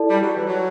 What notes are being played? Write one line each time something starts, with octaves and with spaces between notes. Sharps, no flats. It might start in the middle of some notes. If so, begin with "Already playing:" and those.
Already playing: E4 A4 D5 A5
G3
F#3
E3
F#3